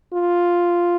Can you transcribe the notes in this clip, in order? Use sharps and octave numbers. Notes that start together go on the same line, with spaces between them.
F4